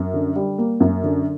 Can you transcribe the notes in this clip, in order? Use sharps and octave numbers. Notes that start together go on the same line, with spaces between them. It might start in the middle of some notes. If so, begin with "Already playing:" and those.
Already playing: F#2
D3
G3
A#3
F#2
D3